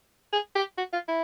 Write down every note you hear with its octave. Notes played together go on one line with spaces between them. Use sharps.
G#4
G4
F#4
F4
E4